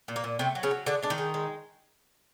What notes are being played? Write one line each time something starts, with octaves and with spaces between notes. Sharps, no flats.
A#2
A#3
A#2
C3 A3 C4
F#3
C#3 C#4
F#3
D3 G#3 D4
G#3 D4
D#3 D#4
G#3
G#3